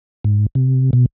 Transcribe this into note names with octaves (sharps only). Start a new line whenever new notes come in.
G#2
C3
B2